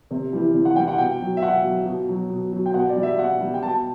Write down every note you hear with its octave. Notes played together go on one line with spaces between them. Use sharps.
C3
E3 G3
C3
F#5
E3 G3 G5
F#5
B2 G5
F#3
E5
B2 F#5
F#3
B2
F#3
B2
F#3
G5
B2 F#5
D5
G3
E5
B2 F#5
G3
G5
B2 A5